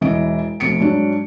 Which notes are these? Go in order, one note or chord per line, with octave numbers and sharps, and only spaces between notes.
E1 E3 D#5 D7
F1 B2 C#7 D7
G#2 F#3 D4